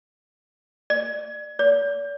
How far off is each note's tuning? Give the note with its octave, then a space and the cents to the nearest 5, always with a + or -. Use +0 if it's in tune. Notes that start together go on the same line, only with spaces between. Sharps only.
D5 +30
D5 -45